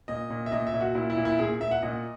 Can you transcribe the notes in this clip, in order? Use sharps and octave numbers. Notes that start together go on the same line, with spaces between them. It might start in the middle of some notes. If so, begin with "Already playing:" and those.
A#2 D#5
A#2
E5
A#2 D#5
E5
A#2
F#4
A#2 E4
E4
A#2
E4
A#2 G#4
A#2 E5
F#5
A#2 D#5